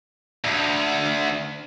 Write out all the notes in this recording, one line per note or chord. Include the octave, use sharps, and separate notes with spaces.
D2